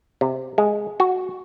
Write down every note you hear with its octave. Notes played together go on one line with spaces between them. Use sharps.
C3
G#3
F#4